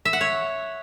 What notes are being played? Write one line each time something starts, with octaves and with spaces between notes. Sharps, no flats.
E5
F#5
C#5